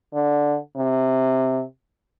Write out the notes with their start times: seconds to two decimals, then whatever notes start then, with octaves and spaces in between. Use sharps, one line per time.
0.14 D3
0.76 C3